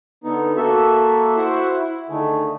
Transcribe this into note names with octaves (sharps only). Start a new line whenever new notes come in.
D3 B3 D#4
A#3 F#4 A4 E5
E4 F#4 C5 E5 F#5
E4
D3 D#3 A3 G#4